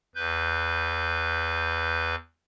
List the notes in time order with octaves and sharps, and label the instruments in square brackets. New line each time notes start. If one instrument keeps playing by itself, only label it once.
[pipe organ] E2 B4 G6